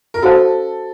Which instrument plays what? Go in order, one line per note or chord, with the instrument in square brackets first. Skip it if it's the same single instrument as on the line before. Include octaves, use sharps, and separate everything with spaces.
[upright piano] A#4
[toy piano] C#4 F#4 C5 F5 A5 [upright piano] A4